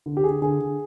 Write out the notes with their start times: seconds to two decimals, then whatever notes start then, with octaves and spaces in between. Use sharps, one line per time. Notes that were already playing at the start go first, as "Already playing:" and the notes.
0.06 D3
0.17 G4
0.24 D3 G#4
0.42 D3 G#4
0.60 D3